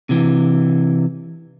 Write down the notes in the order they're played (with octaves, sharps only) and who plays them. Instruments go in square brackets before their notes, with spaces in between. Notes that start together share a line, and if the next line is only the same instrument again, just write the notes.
[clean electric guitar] C3 E3